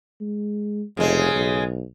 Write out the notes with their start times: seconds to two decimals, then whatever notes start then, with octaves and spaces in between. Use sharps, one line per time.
0.21 G#3
0.97 F1 C#3 G#3
1.34 B1